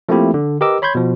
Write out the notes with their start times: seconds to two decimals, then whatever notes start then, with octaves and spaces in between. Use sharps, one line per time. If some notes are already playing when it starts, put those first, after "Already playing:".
0.09 F3 A3 A#3 C4 E4 G4
0.34 D3
0.61 G4 A#4 B4 D#5 D6 E6
0.82 C#5 B5 C6 G6 G#6
0.95 B2 F3